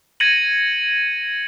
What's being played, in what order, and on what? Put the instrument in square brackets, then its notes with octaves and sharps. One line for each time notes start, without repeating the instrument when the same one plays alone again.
[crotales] G#6 A#6 C#7 D#7 F#7